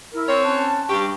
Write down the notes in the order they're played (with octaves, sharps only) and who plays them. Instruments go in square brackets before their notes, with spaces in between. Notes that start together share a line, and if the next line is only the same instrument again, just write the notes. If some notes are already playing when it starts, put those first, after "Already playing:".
[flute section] E4 A#4
[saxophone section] C4 C#5
[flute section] C#4 A5 F#6
[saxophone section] G2 G4 [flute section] C#6